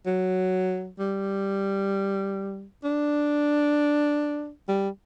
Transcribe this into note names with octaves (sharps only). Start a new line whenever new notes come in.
F#3
G3
D4
G3